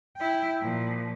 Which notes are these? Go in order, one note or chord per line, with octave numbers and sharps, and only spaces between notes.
E4 G5
A#2 F3